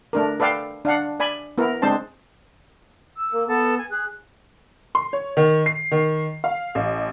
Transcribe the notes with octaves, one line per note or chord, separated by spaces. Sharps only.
A3 D4 A#4
A4 B4 D5 F5 G5
D4 F5 F#5
D5 G#5 B5
B3 E4 A#4
G#3 C4 D4 C5 A5
E6
A#3
B3 A4
G#5
G#4 F#6
C6
C#5
D#3
C7
D#3
F5
A1